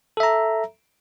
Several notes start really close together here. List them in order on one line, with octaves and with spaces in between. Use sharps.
A4 E5 A#5